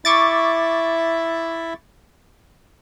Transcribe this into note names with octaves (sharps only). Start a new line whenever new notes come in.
E4 E5 C#6 D6 A6